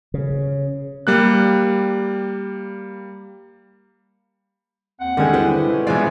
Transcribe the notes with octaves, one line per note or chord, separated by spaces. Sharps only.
C#3
G3 A#3 F#6
D#2 C4 F#5
D3 D#3 G3 G#3 C#4
E4 B4 C5
C#4 F4 A4
E3 G#3 B3 C#4 F4 C5 D5